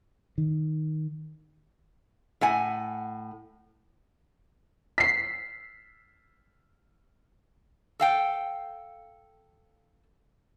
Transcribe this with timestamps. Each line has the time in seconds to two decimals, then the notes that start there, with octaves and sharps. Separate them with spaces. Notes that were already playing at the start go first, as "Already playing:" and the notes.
0.38 D#3
2.41 A2 F#5 G#5
4.98 B6 C7
8.00 A4 F5 G5